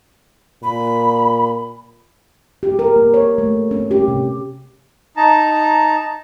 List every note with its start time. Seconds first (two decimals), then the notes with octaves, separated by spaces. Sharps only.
0.63 A#2 B5
2.63 G4
2.79 A#4
2.96 A#3
3.14 C#5
3.38 A3
3.71 C#4
3.91 G4
4.08 C3
5.17 D#4 A5 A#5